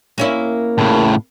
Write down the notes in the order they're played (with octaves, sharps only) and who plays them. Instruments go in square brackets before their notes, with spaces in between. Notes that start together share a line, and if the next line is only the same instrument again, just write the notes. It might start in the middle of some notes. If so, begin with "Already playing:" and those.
[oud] A#3 C#4 E4
[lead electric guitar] A2 C#3